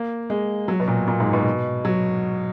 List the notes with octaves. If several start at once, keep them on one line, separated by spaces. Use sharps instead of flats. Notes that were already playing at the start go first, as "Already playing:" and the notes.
Already playing: A#3
G#3
F#3
B2
A#2
A#2
G#2
B2
F#3